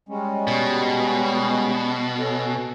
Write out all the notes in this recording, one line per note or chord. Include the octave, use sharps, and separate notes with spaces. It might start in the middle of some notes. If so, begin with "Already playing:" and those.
G3 G#3 C#4
B2
C#4 A4